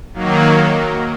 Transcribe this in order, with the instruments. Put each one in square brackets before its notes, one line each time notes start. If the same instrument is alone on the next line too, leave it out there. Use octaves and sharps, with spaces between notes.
[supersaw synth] D#3 F#3 A#3